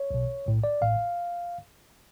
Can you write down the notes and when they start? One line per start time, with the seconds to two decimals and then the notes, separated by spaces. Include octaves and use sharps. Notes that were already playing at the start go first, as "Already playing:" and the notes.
Already playing: C#5
0.11 B1 B2
0.45 B1 A2
0.64 D5
0.81 A1 A2 F5